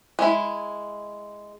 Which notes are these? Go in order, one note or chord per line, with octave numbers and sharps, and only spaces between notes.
G#3 E4